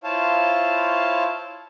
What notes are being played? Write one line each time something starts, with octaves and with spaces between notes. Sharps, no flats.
E4 F4 C5 C#5 F5 A5